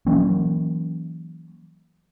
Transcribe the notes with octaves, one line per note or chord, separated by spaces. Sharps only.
E3 F#3 A#3 C#4